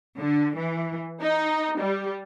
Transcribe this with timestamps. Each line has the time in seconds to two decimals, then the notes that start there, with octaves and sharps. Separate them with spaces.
0.18 D3
0.58 E3
1.22 D#4
1.81 G3